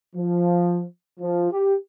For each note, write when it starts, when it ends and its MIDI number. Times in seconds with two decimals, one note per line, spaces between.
0.16 0.84 53
1.20 1.48 53
1.52 1.75 67